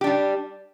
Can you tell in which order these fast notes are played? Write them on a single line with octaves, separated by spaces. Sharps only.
G4 D4 G3